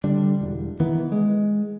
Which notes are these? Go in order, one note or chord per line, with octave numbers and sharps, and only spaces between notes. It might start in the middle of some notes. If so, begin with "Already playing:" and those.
D3 G3 D4
E1
D#3 E3 B3
G#3